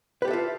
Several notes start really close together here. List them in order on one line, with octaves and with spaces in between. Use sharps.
B4 G4 A4 E5 F4